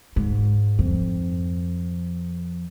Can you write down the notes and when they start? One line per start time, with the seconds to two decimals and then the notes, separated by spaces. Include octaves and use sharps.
0.16 G#2
0.79 F2